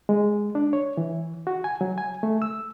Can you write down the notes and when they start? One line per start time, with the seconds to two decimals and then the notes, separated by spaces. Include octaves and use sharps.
0.09 G#3
0.55 D4
0.73 C#5
0.97 E3
1.47 F#4
1.64 G#5
1.81 F#3
1.98 G#5
2.23 A3
2.42 E6